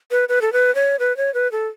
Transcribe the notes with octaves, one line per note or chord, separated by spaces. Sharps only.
B4
B4
A4
B4
C#5
B4
C#5
B4
A4